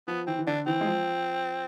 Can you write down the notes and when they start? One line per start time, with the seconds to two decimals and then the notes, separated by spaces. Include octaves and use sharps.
0.07 F3 B3
0.27 E3 C4
0.39 E3
0.47 D3 D4
0.66 E3 C4
0.81 G#3
0.86 F3